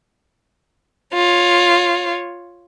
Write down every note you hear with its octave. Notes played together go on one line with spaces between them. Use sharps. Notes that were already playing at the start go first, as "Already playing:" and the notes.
F4 C#5